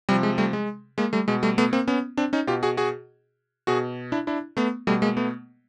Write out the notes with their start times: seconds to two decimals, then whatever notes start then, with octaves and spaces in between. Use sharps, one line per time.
0.09 C3 F3 G3
0.23 G#3
0.38 G3 A3
0.53 G#3
0.98 G#3 A#3
1.13 G3 A3
1.28 B2 G#3
1.43 G3 A3
1.58 A3 B3
1.73 A#3 C4
1.87 B3 C#4
2.17 C4 D4
2.33 C#4 D#4
2.47 B2 F4 G4
2.63 F#4 G#4
2.77 F#4 G#4
3.67 B2 F#4 G#4
4.12 D4 E4
4.27 D4 E4
4.57 A3 B3
4.87 B2 G3 A3
5.02 G#3 A#3
5.17 A3 B3